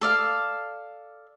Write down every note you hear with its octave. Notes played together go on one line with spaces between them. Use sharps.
A4 D5 F5